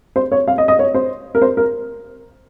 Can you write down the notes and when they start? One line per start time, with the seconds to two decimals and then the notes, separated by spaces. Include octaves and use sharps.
0.16 C5
0.32 C#5
0.48 F5
0.58 D#5
0.68 D#5
0.79 C#5
0.94 C5
1.35 A#4
1.42 C5
1.57 A#4